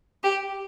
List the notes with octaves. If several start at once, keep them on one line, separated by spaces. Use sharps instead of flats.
G4